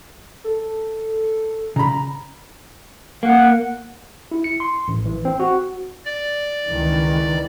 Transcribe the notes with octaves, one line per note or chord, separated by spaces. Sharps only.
A4
C#3 A#5 B5
A#3 F#5
E4
C#7
C6
A1
E3
C4
F#4
D5
C#2 D#3 E3